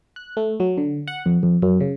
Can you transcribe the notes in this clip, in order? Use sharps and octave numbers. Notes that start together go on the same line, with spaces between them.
F#6
A3
F#3
D3
F#5
F2
F2
F#2
C#3